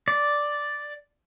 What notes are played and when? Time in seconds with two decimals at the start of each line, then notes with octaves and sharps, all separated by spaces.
0.08 D5